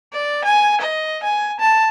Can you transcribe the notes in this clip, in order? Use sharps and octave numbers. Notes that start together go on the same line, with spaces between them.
D5
G#5
D#5
G#5
A5